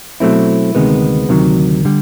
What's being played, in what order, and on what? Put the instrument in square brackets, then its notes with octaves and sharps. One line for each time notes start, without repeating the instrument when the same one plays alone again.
[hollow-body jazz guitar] B2 F#3 A3 C4 E4
D2 C3 D#3 G#3 B3
D2 C3 D#3 F#3
D3 G3